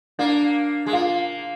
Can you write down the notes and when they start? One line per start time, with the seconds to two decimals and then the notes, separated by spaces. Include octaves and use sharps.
0.19 A#3 D4
0.86 G#3
0.93 A#3 F4